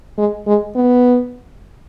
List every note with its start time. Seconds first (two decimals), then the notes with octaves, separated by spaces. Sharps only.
0.18 G#3
0.47 G#3
0.75 B3